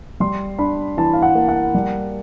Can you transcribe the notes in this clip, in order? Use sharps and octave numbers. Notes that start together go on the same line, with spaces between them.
G3 C6
D4 B5
E3 A5
F5
F#5
A#3
F#5
G3